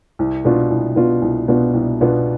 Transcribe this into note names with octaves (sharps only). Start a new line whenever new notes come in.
C2
B2 B3 D4 F4
C2
B2 B3 D4 F4
C2
B2 B3 D4 F4
C2
B2 B3 D4 F4